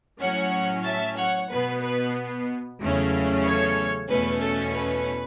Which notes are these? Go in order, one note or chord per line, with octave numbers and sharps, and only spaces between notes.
A2 F#3 C#4 C#5 F#5
E5 A5
C#5 F#5
B2 B3 B4
B4
E2 C#3 F#3 A3 C#4
A4 C#5
E2 B2 A3 C#4 B4
A4
B4